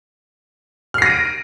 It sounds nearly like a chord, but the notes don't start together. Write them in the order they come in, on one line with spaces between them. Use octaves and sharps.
F6 C7 A#6 D#7 D7